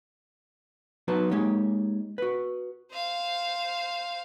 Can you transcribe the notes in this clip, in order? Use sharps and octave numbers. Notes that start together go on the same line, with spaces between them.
F#3 B3 D#4 F#4 B4 A5
G#3 A#3 D#4 G4 C#5
F#4 B4
C5 F5